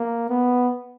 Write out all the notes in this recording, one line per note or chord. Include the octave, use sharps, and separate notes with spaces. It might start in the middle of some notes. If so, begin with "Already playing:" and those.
Already playing: A#3
B3